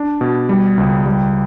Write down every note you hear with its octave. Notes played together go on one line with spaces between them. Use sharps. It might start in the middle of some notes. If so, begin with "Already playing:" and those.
Already playing: D4
B2
G3
C#2
G3